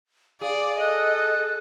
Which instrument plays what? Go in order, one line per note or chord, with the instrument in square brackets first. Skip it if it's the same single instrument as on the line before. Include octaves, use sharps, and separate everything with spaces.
[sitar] G#4 [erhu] D5 [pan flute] F5
[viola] A4 [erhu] D#5 [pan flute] F#6